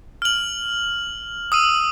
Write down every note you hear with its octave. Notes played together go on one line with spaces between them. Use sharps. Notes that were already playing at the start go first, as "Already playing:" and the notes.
F6 F#7
D#6 E6 D#7